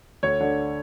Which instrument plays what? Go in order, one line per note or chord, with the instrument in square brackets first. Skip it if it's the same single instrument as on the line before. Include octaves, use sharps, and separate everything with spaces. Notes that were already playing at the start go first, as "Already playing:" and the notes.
[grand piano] D2 C#5
D3